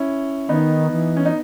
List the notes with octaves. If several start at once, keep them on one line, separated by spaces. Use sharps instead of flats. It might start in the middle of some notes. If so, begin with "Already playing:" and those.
Already playing: C#4 E4
D#3 B3 D#4
E3
C#4
D#4